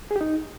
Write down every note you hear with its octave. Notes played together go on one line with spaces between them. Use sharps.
G#4
G4
D#4